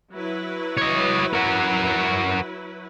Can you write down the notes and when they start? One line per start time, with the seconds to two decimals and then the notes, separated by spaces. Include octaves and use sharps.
0.13 F#3 E4 B4
0.77 C#5 D#5
1.33 F#4 A#4